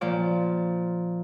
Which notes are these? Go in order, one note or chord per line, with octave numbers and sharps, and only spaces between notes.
A#2 F3 D5 D6